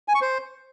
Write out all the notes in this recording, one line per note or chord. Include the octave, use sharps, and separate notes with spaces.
G#5
C#6
C5